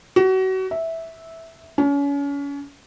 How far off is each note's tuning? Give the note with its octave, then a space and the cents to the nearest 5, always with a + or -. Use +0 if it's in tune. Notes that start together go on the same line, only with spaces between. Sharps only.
F#4 +30
E5 -10
C#4 +35